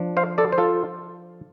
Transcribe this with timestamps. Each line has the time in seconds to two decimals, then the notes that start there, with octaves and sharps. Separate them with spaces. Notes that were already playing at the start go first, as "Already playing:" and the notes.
Already playing: F3 D4
0.17 C5 F5
0.38 A4 D5
0.52 C5
0.58 F4 A4